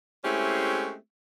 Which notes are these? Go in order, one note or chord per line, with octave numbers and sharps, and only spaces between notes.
G#3 A3 C4 C#4 E4 G4